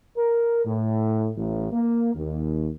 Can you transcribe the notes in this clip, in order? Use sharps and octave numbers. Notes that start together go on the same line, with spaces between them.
A#4
A2
A1
A#3
D#2